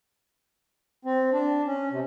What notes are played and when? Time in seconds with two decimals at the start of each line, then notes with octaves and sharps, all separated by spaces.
1.05 C4
1.33 D4
1.67 C#4
1.92 C3